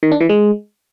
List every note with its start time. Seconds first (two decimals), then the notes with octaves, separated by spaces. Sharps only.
0.03 D#3
0.12 D4
0.21 E3
0.29 G#3